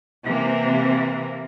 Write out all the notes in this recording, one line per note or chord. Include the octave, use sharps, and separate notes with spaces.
C3 E3 A#3